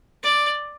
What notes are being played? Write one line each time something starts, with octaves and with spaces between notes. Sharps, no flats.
D5